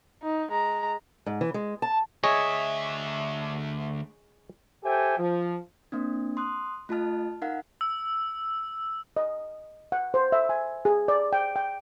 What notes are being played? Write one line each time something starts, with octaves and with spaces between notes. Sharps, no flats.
D#4
G#3 A#5
G#2
E3
G#3
A5
D2 G#4 C#5 D#5 E5
G4 A4 C5 E5 G5 G#5
F3
A#3 C4 D4
C6 D#6 F#6
A3 F4 D#5 A5 F6
D#4 A#4 F5 F#5 F6
E6
D#5
F#5
C5
E5
G#5
G#4
D5
G5
G5